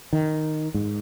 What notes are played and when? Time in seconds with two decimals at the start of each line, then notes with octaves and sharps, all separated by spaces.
0.13 D#3
0.74 G#2